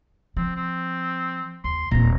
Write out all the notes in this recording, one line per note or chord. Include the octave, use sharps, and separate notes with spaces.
F3 C4
C4
D#2 C6
D#1 A#2 C4 A#5